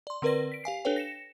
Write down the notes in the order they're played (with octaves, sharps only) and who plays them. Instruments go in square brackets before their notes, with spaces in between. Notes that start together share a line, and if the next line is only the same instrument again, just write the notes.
[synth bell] D5 C6
D3 C4 A#4 B4 D5 A#6
B6 D7
G4 F5 G#5 C7
D4 G4 A4 B4 C#5 G5
A#6 C#7 E7